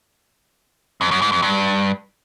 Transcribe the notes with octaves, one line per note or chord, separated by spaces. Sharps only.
F2
F#2
G#2
F2
G2